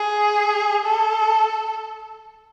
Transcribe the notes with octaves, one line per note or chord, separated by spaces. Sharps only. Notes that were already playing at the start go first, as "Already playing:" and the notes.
Already playing: G#4
A4